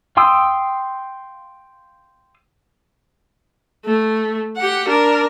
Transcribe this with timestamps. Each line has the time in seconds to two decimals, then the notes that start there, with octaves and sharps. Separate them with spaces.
0.17 F5 G5 C6 D#6 E6
3.85 A3
4.57 G4 F#5
4.88 D4 A#4